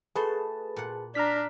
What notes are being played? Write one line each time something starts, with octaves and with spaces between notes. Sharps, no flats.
A3 F#4 G#4 B4 A5 C6
A#2 F#5
D4 A#5 F6 B6